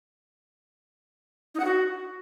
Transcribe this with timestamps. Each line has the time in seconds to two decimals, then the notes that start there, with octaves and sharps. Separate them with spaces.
1.55 D#4
1.60 F#5
1.65 F#4